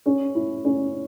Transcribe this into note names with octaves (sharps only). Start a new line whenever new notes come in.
C#4
E4
C#4